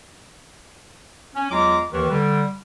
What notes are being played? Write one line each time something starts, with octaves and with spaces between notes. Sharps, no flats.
C#4
E2 F#3 G#3 F4 A#5 D6
D#2 D#3 E3
D3 G3